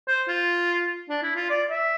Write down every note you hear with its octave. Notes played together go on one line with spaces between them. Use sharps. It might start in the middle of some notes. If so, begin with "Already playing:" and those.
C5
F4
D4
E4
F4
D5
E5